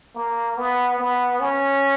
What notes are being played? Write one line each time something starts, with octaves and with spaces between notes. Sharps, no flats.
A#3
B3
B3
C#4